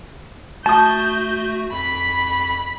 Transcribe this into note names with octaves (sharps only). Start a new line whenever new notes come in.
A3 F#4 A5 D#6 G6
F2 B5 B6